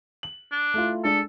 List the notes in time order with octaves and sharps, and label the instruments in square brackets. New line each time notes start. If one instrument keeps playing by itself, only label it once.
[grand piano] F#7
[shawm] D4
[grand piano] A3 E4 F4
[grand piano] G#3 D4 [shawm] A4